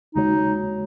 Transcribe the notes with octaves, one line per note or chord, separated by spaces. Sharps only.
D#2 C#3 G#3 D#4 F#4 C#5